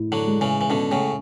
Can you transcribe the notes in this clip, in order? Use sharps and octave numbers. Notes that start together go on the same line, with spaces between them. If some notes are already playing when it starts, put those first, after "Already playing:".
Already playing: A2 E4
D3 F#3
G#3
C#3 E3
E3
B2 D3 C#4
A2 C#3